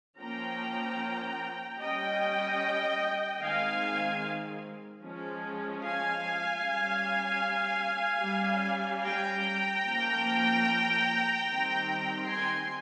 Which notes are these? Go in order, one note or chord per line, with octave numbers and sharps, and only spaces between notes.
F3 A#3 C#4 G5 A#5
G3 C#4 D#5 G5
D#3 G#3 C4 F5 G#5
F3 G#3 C#4
F5 G#5
G3 C#4
G3
C#4
G5 A#5
F3 A#3 C#4
D#3 G3 C4
G#5 C6